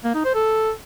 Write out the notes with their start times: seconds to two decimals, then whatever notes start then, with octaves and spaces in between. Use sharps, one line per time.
0.04 A#3
0.14 D#4
0.24 C5
0.34 A4